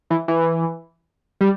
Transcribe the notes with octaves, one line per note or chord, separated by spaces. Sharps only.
E3
E3
G3